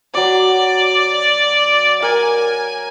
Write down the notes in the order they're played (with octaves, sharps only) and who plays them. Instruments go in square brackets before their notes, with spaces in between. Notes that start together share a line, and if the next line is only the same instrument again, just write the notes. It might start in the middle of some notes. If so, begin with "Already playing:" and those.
[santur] F#3 D6 [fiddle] D5
[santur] A#4 [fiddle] G#5